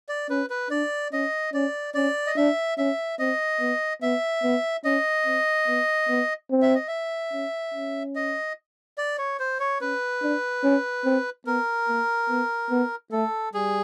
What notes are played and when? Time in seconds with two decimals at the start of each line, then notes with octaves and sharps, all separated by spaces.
0.09 D5
0.29 C#4 B4
0.50 B4
0.70 D4 D5
1.12 C#4 D#5
1.53 C#4 D5
1.94 C#4 D5
2.27 D#5
2.37 D4 E5
2.78 C#4 E5
3.19 C4 D#5
3.60 B3
4.02 B3 E5
4.43 B3
4.84 C#4 D#5
5.26 C4
5.67 B3
6.09 B3
6.50 C4
6.62 E5
6.75 D#5
6.88 E5
7.33 C#4
7.74 C#4
8.15 D#5
8.98 D5
9.18 C#5
9.39 C5
9.60 C#5
9.81 C#4 B4
10.22 D4
10.63 C#4
11.05 C4
11.46 B3 A#4
11.88 A#3
12.29 B3
12.70 B3
13.12 A3 A4
13.53 G3 G#4